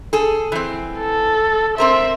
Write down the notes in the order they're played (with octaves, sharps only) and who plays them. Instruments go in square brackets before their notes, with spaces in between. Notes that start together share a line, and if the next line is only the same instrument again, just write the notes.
[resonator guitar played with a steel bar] G#4 A4
E3 C4
[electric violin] A4
[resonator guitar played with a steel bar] C4 A#4 C5 [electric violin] E5